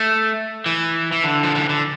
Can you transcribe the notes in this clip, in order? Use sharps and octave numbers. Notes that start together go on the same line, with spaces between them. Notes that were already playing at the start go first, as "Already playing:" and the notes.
Already playing: A3
E3
E3
D3
F3
E3
D3